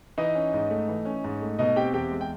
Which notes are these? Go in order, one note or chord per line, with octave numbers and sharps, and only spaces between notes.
E3 D#4 D#5
C#4
G#2
A3
E3
C#4
G#2
A3
B2 D#4 D#5
C4 G4 G5
E2 G4 G5
G#3
G5